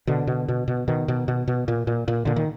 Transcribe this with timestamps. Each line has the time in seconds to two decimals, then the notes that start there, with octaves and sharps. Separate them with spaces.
0.07 B2 D3
0.27 B2
0.49 B2
0.68 B2
0.88 B2 D#3
1.08 B2
1.28 B2
1.48 B2
1.68 A#2
1.87 A#2
2.08 A#2
2.25 A#2 D3
2.36 D#3